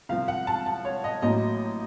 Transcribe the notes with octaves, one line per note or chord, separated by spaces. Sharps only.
C2 C3 F3 C4 F5
F#5
A5
A5
C#5
D#5
A1 A2 F#3 A#3 D#5